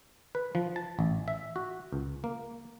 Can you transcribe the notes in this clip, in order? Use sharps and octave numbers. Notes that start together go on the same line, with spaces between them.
B4
F3
A5
A1
E5
F#4
C#2
A#3